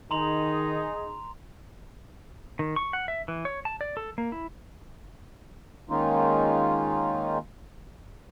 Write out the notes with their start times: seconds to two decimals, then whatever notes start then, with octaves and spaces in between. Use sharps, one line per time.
0.11 D#3 D#4 G#4 A#5 C6 F7
2.59 D#3
2.76 C#6
2.93 F#5
3.08 E5
3.28 E3
3.45 C#5
3.65 A5
3.81 D5
3.97 A4
4.18 A#3
4.32 E4
5.89 D#3 G#3 A#3 C#4 D#4 F4